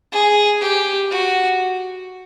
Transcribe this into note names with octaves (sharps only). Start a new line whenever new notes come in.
G#4
G4
F#4